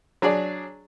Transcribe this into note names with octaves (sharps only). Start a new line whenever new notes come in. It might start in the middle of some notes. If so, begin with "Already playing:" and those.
F#3 D4 G#4 D5